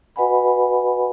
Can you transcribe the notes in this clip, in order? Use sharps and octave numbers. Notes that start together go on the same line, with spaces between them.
F#4 B4 D#5 F#5 G#5 B5